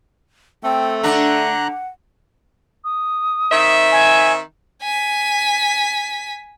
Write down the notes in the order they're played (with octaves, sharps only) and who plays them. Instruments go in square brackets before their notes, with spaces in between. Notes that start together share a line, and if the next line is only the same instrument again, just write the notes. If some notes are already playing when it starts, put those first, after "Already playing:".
[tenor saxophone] A3 [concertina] C4 A4 [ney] G5
[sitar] D3 D4 [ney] F#5 [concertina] A#5 F#6
[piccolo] D#6
[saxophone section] D#3 C4 E5
[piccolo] G#5
[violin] G#5 B6